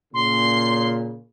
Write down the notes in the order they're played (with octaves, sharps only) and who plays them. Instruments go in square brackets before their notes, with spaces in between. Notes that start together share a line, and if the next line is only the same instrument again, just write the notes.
[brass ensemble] A#2 C#3 [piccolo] C6